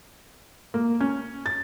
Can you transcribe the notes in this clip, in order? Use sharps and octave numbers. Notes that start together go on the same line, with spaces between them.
A#3
C#4
A6